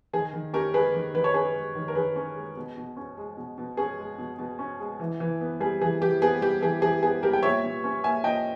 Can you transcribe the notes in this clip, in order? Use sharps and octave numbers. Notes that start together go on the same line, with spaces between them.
D#3 G#4
D#3
C#4 G4 A#4
G#3 G#4 B4
D#3
D#3 B4
C#5
C#4 G#4 B4
G#3
D#3
A#4
D#3 G#4 B4
C#4
G#3
B2
B2
C#4
G#3
B2
B2
C#4 G#4
G#3
B2
B2
C#4
G#3
E3
E3
B3
G3 G#4
E3 G#4
E3 G4
B3 G#4
G3 G4
E3 G#4
E3 G#4
B3 G#4
G3 G4 A#4
G5
A#2 C#5 E5
A#2
C#4
A#3 E5 G#5
A#2 D#5 G5